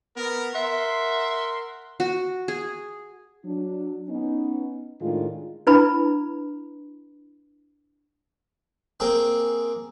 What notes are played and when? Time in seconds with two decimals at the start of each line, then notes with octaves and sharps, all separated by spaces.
0.16 B3 A#4
0.55 A#4 E5 F#5 C6
2.00 F#4
2.48 G#4
3.44 F#3 D4
4.08 B3 C#4 D#4
5.00 A2 D#3 G#3 D4 F4
5.67 D4 E4 B4 A#5 B5
9.00 A#3 C4 G#4 G5